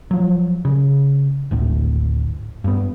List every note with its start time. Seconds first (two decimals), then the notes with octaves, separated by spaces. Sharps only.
0.11 F3 F#3
0.65 C#3
1.51 G#1 D2 A2
2.64 G2 B3